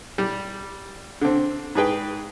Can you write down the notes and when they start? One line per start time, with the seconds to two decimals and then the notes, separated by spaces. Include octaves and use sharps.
0.18 G3
1.22 D3 C4
1.75 G#2 G#4 B4 G5